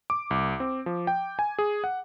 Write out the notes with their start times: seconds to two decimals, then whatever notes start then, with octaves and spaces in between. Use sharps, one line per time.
0.10 D6
0.31 C2
0.60 C4
0.86 F3
1.07 G5
1.39 G#5
1.59 G#4
1.84 F#5